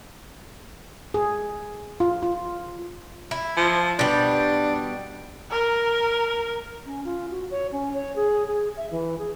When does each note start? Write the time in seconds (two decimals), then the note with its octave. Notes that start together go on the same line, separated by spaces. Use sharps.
1.14 G#4
2.00 F4
2.23 F4
3.31 E4
3.57 F3
3.99 B2 G3 D4
5.51 A#4
6.86 C#4
7.05 F4
7.31 F#4
7.51 C#5
7.72 C#4
7.94 C#5
8.16 G#4
8.47 G#4
8.77 E5
8.91 E3
9.19 G#4